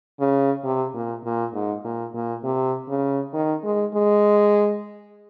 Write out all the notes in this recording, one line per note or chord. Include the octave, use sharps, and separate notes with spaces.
C#3
C3
A#2
A#2
G#2
A#2
A#2
C3
C#3
D#3
G#3
G#3